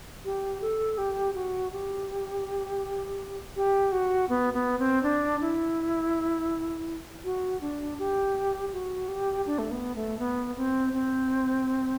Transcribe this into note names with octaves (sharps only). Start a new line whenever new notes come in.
G4
A4
G4
F#4
G4
G4
F#4
B3
B3
C4
D4
E4
F#4
D4
G4
F#4
G4
D4
A3
B3
A3
B3
C4
C4